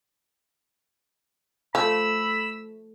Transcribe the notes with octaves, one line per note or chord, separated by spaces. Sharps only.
F3 A3 B5 E6